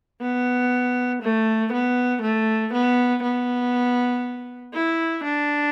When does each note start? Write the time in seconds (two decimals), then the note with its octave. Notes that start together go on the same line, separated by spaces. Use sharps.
0.21 B3
1.22 A3
1.72 B3
2.22 A3
2.73 B3
3.23 B3
4.74 E4
5.23 D4